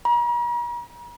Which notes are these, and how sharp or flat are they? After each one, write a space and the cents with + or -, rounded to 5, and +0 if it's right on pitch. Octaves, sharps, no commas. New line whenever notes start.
A#5 +45